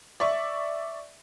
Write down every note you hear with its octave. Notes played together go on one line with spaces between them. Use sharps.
D5 E5 C#6